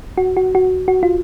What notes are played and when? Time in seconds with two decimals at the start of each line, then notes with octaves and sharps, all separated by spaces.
0.18 F#4
0.37 F#4
0.55 F#4
0.88 F#4
1.03 F4